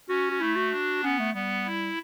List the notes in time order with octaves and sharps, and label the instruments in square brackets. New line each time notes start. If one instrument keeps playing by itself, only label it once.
[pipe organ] C#4 [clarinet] F#4
[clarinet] F#4
[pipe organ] A3 [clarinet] E4
[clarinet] F#4
[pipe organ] D4
[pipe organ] B3 [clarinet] C#4
[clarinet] A3
[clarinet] G3 [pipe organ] B3
[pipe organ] E4